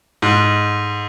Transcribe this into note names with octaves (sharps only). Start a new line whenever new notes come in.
G#2